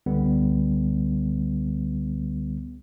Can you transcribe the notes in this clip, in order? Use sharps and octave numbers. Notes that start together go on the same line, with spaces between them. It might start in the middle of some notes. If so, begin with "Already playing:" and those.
C#2 D3 G3 B3